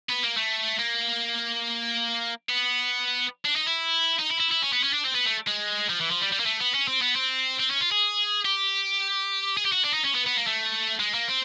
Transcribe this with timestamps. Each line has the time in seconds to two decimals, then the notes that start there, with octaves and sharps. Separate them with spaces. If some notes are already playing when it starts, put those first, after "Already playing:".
0.10 B3
0.23 A#3
0.37 A3
0.79 A#3
2.49 B3
3.45 D4
3.56 D#4
3.66 E4
4.19 D#4
4.30 E4
4.40 E4
4.51 E4
4.62 C#4
4.73 B3
4.83 C#4
4.93 D4
5.05 C4
5.15 B3
5.26 A3
5.47 G#3
5.89 F3
6.00 E3
6.11 F3
6.21 G3
6.32 G3
6.40 A#3
6.46 A3
6.60 B3
6.74 C#4
6.88 C4
7.02 B3
7.16 C4
7.59 C4
7.70 C#4
7.81 F4
7.91 G#4
8.45 G4
9.57 G#4
9.65 G4
9.72 F#4
9.83 D4
9.93 D#4
10.04 C#4
10.15 B3
10.26 B3
10.36 A#3
10.47 A3
11.00 G#3
11.14 A#3
11.28 C4